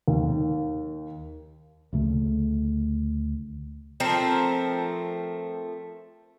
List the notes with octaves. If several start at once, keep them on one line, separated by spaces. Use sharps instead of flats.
D#2
D2 C#3 A3
F3 A3 C4 A#4